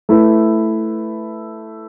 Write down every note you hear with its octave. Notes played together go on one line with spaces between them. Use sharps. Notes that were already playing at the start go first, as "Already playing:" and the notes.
A3 E4 B4